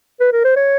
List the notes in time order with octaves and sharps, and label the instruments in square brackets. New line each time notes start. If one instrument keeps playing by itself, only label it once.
[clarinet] B4
A#4
C5
C#5